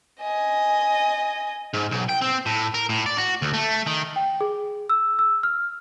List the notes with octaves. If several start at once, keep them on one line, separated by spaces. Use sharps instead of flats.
D#5 G#5
G#2
B1
G5
C4
A2
A#4
A2
D5
F#4
D2
A3
D#3
G5
G#4
E6
E6
F6